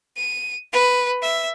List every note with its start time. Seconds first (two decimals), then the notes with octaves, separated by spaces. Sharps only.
0.17 D#7
0.72 B4
1.22 E5